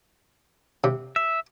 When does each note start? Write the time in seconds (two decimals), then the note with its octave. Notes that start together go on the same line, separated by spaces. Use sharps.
0.84 C3
1.16 E5